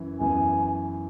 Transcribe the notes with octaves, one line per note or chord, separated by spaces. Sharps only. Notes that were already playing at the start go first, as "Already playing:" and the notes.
Already playing: F#2 E3
F#2 E3 B3 G#5